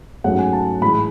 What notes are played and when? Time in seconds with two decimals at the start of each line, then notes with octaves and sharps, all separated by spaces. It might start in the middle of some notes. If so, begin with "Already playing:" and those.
0.24 G#2 F#3 A3 C#4 F#5
0.39 G#5
0.53 A5
0.81 A2 E3 G#3 B5